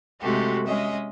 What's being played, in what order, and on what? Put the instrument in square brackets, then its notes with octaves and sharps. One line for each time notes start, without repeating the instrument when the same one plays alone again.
[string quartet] C3 G#3 A3 F#4 G4 A4
G#3 C#4 D#5 E5